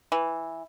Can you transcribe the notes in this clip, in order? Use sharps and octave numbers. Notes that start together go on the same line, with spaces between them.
E3